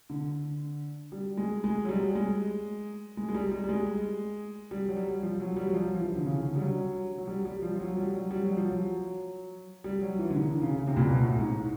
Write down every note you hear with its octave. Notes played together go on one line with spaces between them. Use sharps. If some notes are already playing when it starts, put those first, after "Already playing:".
D3
G3
G#3
G#3
F#3
G3
G#3
G#3
G#3
G3
G3
G3
G#3
G3
F#3
G3
F3
F#3
G3
F#3
F3
F3
E3
D3
C#3
D3
G3
F#3
F#3
G3
G3
F3
F3
F#3
G3
F#3
G3
F#3
F3
F#3
G3
F#3
E3
D3
D#3
D3
C#3
C#3
C3
A#2
B2
A2
G#2